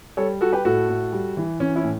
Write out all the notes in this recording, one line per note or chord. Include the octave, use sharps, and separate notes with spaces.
G3 A4 C#5
G3 F#4 A4
G4 B4
A2 F#4 A4
A2
G3
E3
E3 C#4
C#4 E4
A2